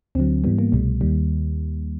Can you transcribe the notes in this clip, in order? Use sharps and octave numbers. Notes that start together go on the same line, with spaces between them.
D2 D3 F#3 C4
G#2 E3 G3 B3
A#3
C2 B2 G3 A3
D#2 D#3 G3 A#3